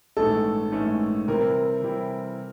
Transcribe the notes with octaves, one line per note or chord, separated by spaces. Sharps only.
A#1 G#2 E3 A3 C#4 A4
A#1 G#2 E3 A3 C#4
C3 E3 G3 C4 E4 A#4
C3 E3 G3 C4 E4